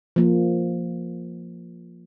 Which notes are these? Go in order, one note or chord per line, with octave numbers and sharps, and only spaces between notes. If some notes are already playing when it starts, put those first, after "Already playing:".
F3 A#3